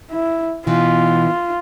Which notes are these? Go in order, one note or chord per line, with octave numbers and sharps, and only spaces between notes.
E4
B2 E3 F4